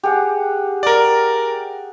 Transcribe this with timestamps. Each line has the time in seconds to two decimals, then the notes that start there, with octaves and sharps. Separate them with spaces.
0.03 G4 G#4 F#5
0.83 A#4 D5